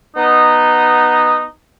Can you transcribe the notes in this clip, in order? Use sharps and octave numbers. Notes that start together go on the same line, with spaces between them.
B3 D#4